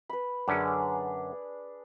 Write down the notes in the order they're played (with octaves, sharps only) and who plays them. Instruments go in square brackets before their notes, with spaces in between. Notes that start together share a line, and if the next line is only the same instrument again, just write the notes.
[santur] B4 B5
[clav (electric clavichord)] F#2 D3 C#4 [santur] D4 G#4